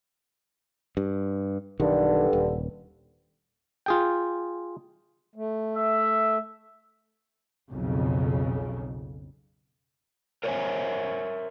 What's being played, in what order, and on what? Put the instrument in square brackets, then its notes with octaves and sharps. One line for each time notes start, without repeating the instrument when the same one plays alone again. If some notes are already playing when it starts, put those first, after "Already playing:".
[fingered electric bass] G2
[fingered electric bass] B1 D#3 [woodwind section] G2 D3
[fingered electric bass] D#1
[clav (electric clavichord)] F4 G#4 G5
[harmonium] A3
[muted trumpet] E5
[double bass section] B1 F2 C#3
[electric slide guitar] A#4 C5 C#5 D#5 E5 G#5